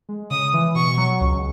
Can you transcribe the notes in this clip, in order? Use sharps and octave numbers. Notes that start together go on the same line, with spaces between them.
G#3
C#3 D#6
E3
B2 C#6
F#3
C#2